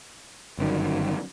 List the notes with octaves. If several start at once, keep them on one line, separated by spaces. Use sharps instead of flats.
G1 F#2 D#3